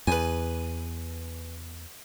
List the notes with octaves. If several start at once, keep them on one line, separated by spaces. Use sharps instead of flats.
E2 B4 G#5